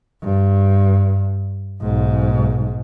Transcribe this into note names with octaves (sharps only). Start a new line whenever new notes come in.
G2
B1 G#2